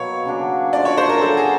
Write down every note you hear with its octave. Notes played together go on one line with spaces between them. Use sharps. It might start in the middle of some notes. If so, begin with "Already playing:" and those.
Already playing: B2 F#3 A#3 C#5
C#3 F#3 A#3 D4
D3 F3 A3 D5
C#5
C5
A#4
C#3 F#3 B3 A4
G#4